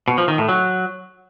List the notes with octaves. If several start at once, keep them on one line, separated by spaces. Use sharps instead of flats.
B2
F3
D#3
A2
F#3